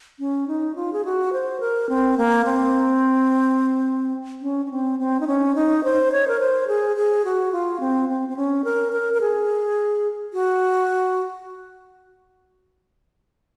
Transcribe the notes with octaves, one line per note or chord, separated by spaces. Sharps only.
C#4
D#4
F4
G#4
F#4
C5
A#4
C4
A#3
C4
C#4
C#4
C4
C4
D#4
C#4
D#4
C5
C#5
A#4
C5
G#4
G#4
F#4
F4
C4
C4
C4
C#4
A#4
A#4
A#4
G#4
F#4